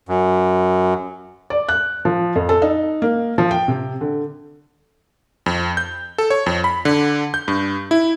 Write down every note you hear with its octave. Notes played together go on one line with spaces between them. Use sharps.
F#2
D5
F#6
F3
F2
A4
D#4
A#3
F3
G5
C3
D3
F2
G6
A4
C#5
F2
B5
D3
G6
G2
E4